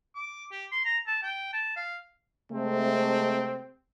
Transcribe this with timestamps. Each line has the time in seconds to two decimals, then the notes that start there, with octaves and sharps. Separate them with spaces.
0.15 D6
0.52 G4
0.72 C6
0.85 A#5
1.07 A5
1.23 G5
1.53 A5
1.76 F5
2.52 C3 G#3 A3 C4